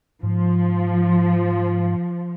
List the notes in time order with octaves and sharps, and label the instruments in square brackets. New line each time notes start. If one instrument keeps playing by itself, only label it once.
[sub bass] G#2 [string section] F3